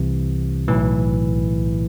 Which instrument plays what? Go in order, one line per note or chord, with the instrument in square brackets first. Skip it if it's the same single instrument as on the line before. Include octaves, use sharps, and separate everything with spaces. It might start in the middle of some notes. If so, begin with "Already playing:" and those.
Already playing: [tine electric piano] C2 C3 E3
B1 A2 E3